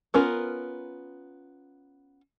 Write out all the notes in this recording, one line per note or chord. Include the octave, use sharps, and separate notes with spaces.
B3 C#4 F4 A#4